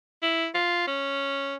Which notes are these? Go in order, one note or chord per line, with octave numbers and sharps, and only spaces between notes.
E4
F4
C#4